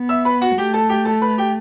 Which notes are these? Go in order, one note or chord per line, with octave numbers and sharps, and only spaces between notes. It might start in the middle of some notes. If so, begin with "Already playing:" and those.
Already playing: B3
E5 E6
B4 B5
F#4 F#5
A3 G4 G5
A4 A5
G4 G5
A4 A5
B4 B5
G4 G5